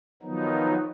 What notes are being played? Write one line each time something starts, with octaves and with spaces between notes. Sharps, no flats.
D#3 F3 F#3 B3 D#4